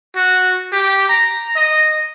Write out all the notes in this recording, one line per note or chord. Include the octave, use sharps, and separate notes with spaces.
F#4
G4
A#5
D#5